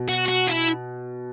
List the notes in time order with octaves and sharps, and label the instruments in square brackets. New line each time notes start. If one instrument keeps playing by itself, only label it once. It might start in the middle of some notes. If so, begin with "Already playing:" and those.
Already playing: [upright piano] B2
[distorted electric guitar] F#4
F#4
E4